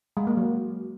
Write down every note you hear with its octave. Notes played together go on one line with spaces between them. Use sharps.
G#3
A#3
F#3